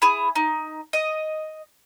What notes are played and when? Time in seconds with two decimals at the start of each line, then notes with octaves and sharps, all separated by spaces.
0.02 E4 G#4
0.36 D#4
0.93 D#5